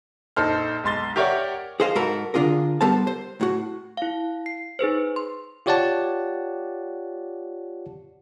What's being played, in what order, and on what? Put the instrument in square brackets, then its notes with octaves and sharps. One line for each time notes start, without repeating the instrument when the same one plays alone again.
[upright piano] A#1 D#4 A4 C5 F6
B1 G#3 C6 A6 G7
G4 A#4 C#5 D5 E5 F#5
[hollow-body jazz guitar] G#4 A4 C5 D#5 F5
G#2 F#4 A4 A#4 B5
D3 D4 F4 G#4 A#4
G3 B3 A4 A#4 C5 A5
C5
A2 F#4
[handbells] E4 F5
C7
D#4 G#4 B4 C5
C6
[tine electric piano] F4 G4 C#5 D5 F#5 A5